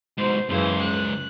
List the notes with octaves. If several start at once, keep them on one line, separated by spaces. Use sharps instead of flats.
G#2 B2 C5
C#2 F#2 C#3 E3 C5
F#6